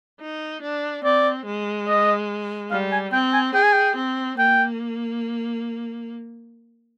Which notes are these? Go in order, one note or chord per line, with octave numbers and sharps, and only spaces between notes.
D#4
D4
C4 D5
G#3
D#5
G3 F5
G#5
C4 G5
G#5
G#4 G5
G#5
G5
C4
A#3 G5